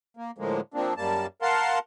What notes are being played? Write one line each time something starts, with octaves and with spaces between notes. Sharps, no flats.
A#3
A2 D3 F3 G#3 A#3
F3 A#3 C4 D4
F#2 G3 A#3 A5
A#4 F5 F#5 A5 C6